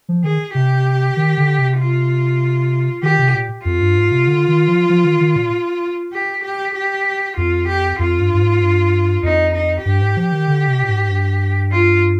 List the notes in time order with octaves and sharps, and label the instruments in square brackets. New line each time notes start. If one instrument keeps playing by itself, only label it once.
[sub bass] F3
[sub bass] D#3 [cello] G#4
[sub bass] C3 [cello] G4
[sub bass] D#3
D3
C3
[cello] F4
[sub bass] D#3 [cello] G4
[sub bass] C3
A#2
[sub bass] F2 [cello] F4
[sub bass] G2
G#2
C3
D3
D#3
F3
F3
D#3
D#3
A#2
[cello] G4
G4
G4
[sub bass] F2 [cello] F4
[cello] G4
[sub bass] F2 [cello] F4
[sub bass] G2
G2
G#2
G2
[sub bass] F2 [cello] D#4
[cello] D#4
[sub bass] G2 [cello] G4
[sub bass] G#2
F3
D#3
D3
C3
A#2
G#2
G2
[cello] F4